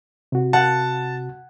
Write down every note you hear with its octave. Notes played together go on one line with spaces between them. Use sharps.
C3 F#4
F#5 A5 F#6